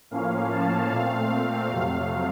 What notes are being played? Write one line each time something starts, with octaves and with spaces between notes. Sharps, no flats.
A2 F3 A#3 C#4 F5
A5
A#2 A3 C4 F5
F2 C3 F#3 A3